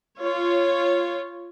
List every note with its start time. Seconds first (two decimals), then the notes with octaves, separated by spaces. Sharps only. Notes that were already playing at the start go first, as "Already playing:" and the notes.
0.20 F4 C#5